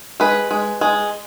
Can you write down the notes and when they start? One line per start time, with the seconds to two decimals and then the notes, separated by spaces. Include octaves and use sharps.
0.20 G#3 B4
0.51 G#3
0.81 G#3